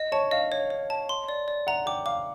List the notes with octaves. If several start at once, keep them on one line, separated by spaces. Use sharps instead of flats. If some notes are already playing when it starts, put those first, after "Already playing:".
Already playing: D#5
C#5 A5
D#5 F5
C#5
C#5
A5
C6
D5
D5
F#5 A#5
G5 D6
F5 D6